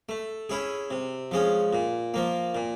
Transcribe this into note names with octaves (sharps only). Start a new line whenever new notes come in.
A3
C#4 E4 G#4
C3
F3 G#3 C#4
A#2
F3 A#3
A#2